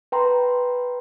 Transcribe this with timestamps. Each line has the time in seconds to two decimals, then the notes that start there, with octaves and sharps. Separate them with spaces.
0.12 B4 G5 A#5 C6